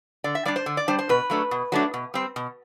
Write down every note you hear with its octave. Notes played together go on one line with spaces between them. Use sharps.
D3 D5
E5
G3 D4 D5
C5
D3
D5
G3 D4 C5
C5
B2 B4
F#3 A3 D4
B2
F#3 A3 D4
B2
G3 C4
B2